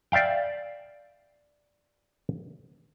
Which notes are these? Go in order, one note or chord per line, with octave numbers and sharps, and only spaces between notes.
D5 E5 F5 G5